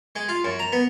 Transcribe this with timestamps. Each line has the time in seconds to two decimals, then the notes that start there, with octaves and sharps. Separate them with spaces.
0.16 G#3
0.29 F4
0.44 F#2
0.59 A#5
0.72 B3